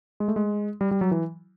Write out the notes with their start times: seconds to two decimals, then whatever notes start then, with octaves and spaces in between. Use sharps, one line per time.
0.20 G#3
0.28 A3
0.36 G#3
0.81 G3
0.91 G3
1.01 F#3
1.11 E3